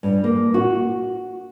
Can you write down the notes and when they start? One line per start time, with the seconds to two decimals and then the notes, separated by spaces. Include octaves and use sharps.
0.03 G2
0.24 A#3
0.54 F#4